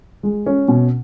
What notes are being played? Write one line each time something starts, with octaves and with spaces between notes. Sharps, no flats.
G#3
C#4
B2